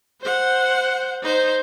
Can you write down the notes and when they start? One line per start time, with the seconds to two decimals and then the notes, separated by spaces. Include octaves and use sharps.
0.21 C5 F#5
1.23 D#4 C5